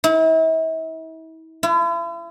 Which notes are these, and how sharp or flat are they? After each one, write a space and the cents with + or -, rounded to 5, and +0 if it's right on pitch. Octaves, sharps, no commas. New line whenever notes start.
E4 -40
E4 +45